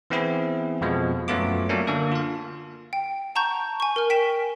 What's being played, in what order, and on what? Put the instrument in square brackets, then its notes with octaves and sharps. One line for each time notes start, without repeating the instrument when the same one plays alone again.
[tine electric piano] E3 B3 C4 E4 G#4
F2 B2 F3 G#3
F#2 F#3 A3 B3 F4 D6
F#3 A3 A#3 C#4 D4
D3 A#3 A4
F4 F5
[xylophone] G5
F#5 A5 A#5 C#6 G6
G#5 C#6
A#4 G#5 F6
G5 B6 D7 E7